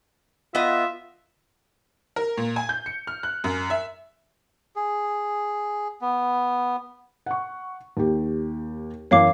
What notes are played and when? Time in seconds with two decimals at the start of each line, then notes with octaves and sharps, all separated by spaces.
0.55 B3 F4 D#5 E5
2.16 A#4
2.37 A#2
2.56 G#5
2.69 G6
2.86 C#7
3.07 F6
3.23 F#6
3.44 F#2
3.70 E5
4.76 G#4
6.01 B3
7.26 F#5 C#6
7.97 D#2 G4
9.11 F#2 E3 C#5 F5 D6